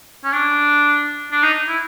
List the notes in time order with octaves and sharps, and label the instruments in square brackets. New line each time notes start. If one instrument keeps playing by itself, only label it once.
[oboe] C#4
D4
D4
D#4
E4